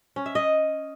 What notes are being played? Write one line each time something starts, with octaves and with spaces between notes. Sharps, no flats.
C#4
E5
D#5